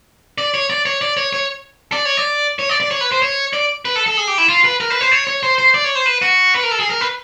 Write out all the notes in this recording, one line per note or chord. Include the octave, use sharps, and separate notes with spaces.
D5
C#5
D5
C#5
D5
C#5
C#5
D5
C#5
D5
C#5
D5
D5
C#5
B4
C5
C#5
D5
B4
A4
A4
G#4
G4
E4
F4
B4
A#4
B4
C5
C#5
C#5
C5
C5
D5
C#5
C5
B4
F#4
B4
A#4
A4
G#4
A#4
B4